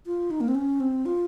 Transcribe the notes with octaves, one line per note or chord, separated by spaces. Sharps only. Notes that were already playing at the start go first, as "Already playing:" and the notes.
F4
D#4
A#3
C4
C#4
C4
F4